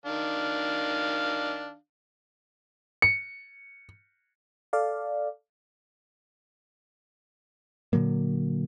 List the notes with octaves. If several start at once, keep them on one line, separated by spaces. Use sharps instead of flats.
D#3 D4 F5
C#7
A4 D5 F5
A#2 D3 F#3 A#3